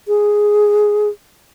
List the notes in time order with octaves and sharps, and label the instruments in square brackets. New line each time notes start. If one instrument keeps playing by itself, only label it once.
[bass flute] G#4